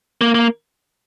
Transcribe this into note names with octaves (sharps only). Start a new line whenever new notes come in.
A#3
A#3